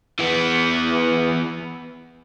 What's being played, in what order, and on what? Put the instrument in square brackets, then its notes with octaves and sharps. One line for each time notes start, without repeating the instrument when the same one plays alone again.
[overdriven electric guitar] E3 B3